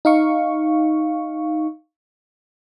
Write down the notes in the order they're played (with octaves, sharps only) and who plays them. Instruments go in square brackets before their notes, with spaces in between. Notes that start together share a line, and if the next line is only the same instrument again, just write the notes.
[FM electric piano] D#4 F5 C#6